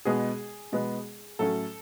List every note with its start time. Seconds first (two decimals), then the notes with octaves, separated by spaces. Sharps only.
0.05 B2 G#3 B3 G#4
0.72 B2 G#3 B3
1.39 A2 F#3 A3 C#4 A4